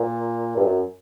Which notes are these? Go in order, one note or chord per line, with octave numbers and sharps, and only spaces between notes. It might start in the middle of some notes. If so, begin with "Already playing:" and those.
Already playing: A#2
G2
F#2